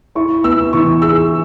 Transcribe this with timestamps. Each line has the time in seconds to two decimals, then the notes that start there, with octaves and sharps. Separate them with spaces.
0.15 E4 C#6
0.44 B3 E6
0.73 E3 C#6
1.02 G#4 E6